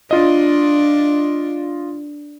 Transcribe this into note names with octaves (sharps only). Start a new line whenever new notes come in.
D4 F4 D#5